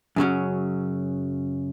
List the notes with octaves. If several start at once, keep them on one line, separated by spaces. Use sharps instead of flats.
F#2 C#3 F#3 C#4